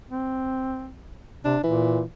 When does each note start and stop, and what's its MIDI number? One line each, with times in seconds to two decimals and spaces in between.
0.11 0.92 60
1.45 1.56 48
1.45 1.63 62
1.64 2.02 46
1.64 2.03 52